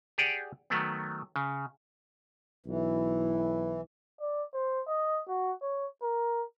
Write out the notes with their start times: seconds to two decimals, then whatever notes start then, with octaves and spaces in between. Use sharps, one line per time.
0.18 G4 G#4 D5 F#5
0.70 D#3 F#3 A3 B3
1.36 C#3
2.66 B1 E3 E4
4.21 D5
4.53 C5
4.88 D#5
5.28 F#4
5.62 C#5
6.02 A#4